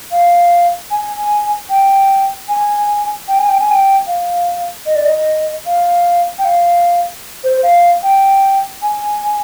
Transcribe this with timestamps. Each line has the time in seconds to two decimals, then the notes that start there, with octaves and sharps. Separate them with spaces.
0.12 F5
0.91 G#5
1.70 G5
2.49 G#5
3.28 G5
3.38 G#5
3.48 G5
3.60 G#5
3.70 G5
4.07 F5
4.86 D#5
4.95 D5
5.05 D#5
5.66 F5
6.38 G5
6.45 F5
7.44 C5
7.63 F5
8.03 G5
8.82 G#5